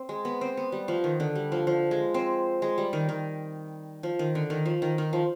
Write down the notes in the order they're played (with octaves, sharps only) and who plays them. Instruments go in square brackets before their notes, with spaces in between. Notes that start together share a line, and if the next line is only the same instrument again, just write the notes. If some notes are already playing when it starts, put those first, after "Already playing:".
Already playing: [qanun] C4
G#3
B3
C4
B3
G3
F3
D#3
D3
G3
F3
F3
G#3
C4
G#3
G3
D#3
D#3
F3
D#3
D3
D#3
F3
D#3
D#3
F3